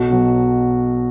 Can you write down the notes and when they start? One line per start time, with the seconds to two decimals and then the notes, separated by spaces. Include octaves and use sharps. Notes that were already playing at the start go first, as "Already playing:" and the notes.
Already playing: B1 F#4
0.10 B2 F#3